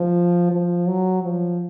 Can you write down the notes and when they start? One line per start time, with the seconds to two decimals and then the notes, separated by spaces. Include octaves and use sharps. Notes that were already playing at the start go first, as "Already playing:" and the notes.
Already playing: F3
0.51 F3
0.86 F#3
1.23 F3